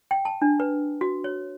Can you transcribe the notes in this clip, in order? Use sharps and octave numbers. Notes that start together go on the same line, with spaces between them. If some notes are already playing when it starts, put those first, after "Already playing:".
G5
A5
D4
B4
F#4
C#5